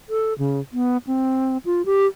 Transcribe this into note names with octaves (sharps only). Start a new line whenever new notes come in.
A4
C#3
B3
C4
F4
G4